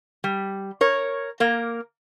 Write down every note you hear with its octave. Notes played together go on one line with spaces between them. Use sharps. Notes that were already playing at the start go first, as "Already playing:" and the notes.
G3
A#4 C#5
A#3 A#4